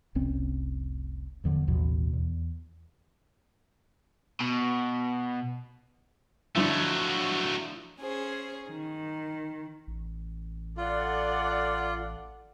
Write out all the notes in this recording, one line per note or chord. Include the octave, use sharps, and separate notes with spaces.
F1 C2 C4 C#4
D#1 E2 D3 F3
A1 D#2 B2
E2
B2
D3 F3 F#3 A3 E4
C#4 G#4 C5
D#3
A1
F4 A4 D5 F#5